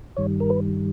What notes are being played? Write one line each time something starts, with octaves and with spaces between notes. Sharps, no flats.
G2 D#3 G3 C#5
A#4
B4